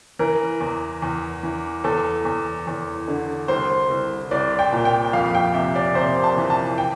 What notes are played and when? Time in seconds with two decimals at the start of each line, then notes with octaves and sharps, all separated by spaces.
0.19 E3 A#4
0.60 E2
1.02 E2
1.43 E3
1.84 E2 A4
2.25 E2
2.67 E2
3.08 D3
3.48 C2 C5
3.90 C2
4.31 C2 D5
4.59 G5
4.72 A#2
4.85 G5
5.13 F2 F5
5.35 G5
5.54 C3 E5
5.75 D5
5.95 C3 C5
6.24 A5
6.37 E3
6.50 A5
6.78 G5